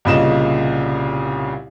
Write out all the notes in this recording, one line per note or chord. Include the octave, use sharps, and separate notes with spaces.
C2 A#2 C#3 D#5 E7